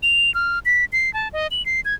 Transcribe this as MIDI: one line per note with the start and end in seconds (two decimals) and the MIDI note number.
0.03 0.33 101
0.34 0.59 89
0.65 0.85 95
0.93 1.12 96
1.14 1.28 81
1.33 1.47 75
1.51 1.64 102
1.66 1.81 96
1.85 1.94 92